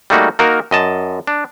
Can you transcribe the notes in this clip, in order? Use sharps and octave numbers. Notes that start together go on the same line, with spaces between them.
G3 A3 A#3 D#4 F#4
A#3 D#4 F#4 A#4
F#2 D#5 A5
D4